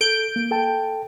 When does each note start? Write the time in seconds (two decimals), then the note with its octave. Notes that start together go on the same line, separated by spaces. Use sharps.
0.01 A4 G6 D7
0.36 A#3
0.51 A4 G5 A5